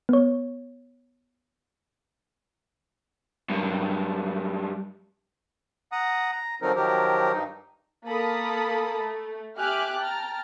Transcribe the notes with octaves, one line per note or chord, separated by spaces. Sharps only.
B3 C#5
G2 F#3
F#5 A#5 D#6
A#5
D3 F3 F#3 C4 D#4 A#4
D#3 F3 F#3 G4 A#4
G2 D#4
A#3 A4 A#4 A5 B5 D#6
A3
G4 E5 G#5 D6 F6 F#6
G5 A5 A#5 F6